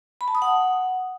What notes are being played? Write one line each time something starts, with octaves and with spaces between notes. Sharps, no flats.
B5
A5
D#6
F#5